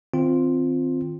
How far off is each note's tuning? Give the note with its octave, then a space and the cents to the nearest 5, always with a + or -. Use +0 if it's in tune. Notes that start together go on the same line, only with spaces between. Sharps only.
D#3 +0 C4 +0 F4 +0